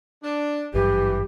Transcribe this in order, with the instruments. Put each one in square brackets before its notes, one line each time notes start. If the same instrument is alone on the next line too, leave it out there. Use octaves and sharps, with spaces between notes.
[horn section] D4
[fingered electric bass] G#1 G2 F#3 [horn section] E3 [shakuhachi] G4